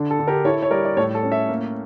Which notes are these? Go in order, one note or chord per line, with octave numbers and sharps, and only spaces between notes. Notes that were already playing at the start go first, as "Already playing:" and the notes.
Already playing: D3 D4
A4
D3
G4 A#4
E4 A4 C#5
C#5
G3 A#4 D5
D5
A2 A4 C#5
A4
C#4
C#5 E5
A#3